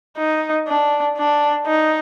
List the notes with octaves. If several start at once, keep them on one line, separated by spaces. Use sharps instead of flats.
D#4
D4
D4
D#4